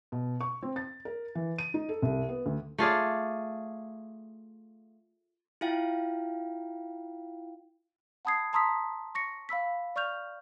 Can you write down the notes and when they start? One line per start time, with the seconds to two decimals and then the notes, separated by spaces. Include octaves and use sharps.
0.12 B2
0.41 C#6
0.62 C4
0.76 A6
1.05 A#4
1.35 E3
1.58 D#7
1.74 D#4
1.89 A4
2.02 C2
2.29 B3
2.46 D2
2.78 A3 F4 G#4 D5
5.61 E4 F4 F5 G5
8.25 F#5 A5 B5 D#6 G#6 C7
8.53 A5 A#5 C6 D#6 E6 B6
9.15 C#6 A#6 C#7
9.49 F5 B5 E6 B6
9.96 D5 C#6 F6 G6 F7